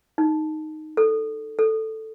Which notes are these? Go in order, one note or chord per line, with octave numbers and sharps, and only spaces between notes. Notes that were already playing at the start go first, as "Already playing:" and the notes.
D#4
A4
A4